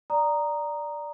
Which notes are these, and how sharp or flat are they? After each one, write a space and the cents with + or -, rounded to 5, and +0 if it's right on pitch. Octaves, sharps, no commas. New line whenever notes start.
D5 +0 A#5 +0 D#6 -15